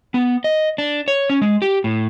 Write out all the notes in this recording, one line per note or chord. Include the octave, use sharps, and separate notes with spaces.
B3
D#5
D4
C#5
C#4
G#3
G4
A2